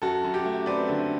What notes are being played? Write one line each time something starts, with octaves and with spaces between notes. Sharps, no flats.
F#2 F#4 A4
F#2
G4
A3
C4 B4 D5
D3